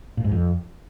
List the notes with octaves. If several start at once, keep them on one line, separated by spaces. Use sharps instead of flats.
A#2
G#2
F2